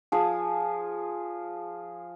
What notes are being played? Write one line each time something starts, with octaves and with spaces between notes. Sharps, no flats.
F3 G#4